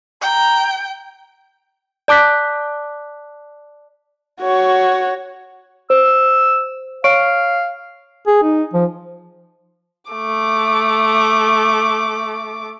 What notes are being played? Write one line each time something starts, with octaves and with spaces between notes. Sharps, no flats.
G5 A#5
D5 A5 D6 F#6 B6
F#4 C#5
C5 E6
C#5 F5 C#6 D7
G#4
D#4
F3
A3 D6